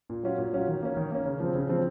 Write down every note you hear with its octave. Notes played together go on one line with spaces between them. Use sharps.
A#2
F#3 C#4 F4
A#2
F#3 C#4 F4
D#3
A#3 C#4
D#3
A#3 C#4
C#3
F3 C4
C#3
F3 C4